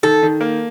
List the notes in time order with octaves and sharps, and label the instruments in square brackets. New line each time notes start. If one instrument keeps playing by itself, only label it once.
[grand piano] D#3 [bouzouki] A4
[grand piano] D#3
A#3